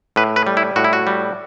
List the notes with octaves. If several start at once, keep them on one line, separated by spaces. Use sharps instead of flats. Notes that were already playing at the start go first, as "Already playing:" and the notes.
A2 B4
B4
G3
E4
A2 F#4
E4
F#4
G3